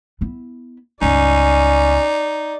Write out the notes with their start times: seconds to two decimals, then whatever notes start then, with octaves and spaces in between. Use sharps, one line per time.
0.21 B3 E4
1.02 C#2 G2 C#4 D#4 D5